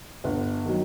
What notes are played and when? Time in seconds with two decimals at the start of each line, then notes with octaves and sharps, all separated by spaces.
0.24 G1
0.65 D#3 F#3